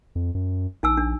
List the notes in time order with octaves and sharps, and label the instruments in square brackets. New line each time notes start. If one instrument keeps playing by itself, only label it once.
[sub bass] F2
F#2
[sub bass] A#1 [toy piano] D#4 G#5 E6
[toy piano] D4